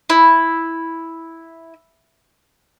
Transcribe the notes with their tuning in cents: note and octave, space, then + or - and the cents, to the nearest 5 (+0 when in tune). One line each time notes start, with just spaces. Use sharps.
E4 -5